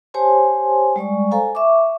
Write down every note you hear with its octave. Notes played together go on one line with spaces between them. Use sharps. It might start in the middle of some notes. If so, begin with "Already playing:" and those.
G4 C5 C#5 G#5 A5 C6
G3 G#3 D5 C#6
A4 C5 F5 G#5 A#5
E5 C#6 D6